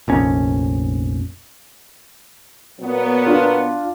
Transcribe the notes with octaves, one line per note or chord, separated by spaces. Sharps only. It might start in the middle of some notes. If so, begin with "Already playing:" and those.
F1 A#1 C#4
A#2 F#3 B3
D4 F4